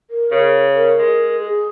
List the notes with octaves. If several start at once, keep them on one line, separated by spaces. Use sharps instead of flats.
A#4
C#3
A#4
G#3
G#4